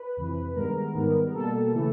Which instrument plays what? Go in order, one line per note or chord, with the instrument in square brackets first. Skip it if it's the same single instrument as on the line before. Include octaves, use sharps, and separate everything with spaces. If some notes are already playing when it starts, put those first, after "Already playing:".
Already playing: [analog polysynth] B4
F2 C3 E3
G2 D#3 G#3 B3 A#4
G#2 D#3 G3 B3
B2 G3 A#3 A4
C#3 E3 A3